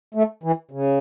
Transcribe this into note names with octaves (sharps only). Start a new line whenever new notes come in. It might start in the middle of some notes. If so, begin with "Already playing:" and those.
A3
E3
C#3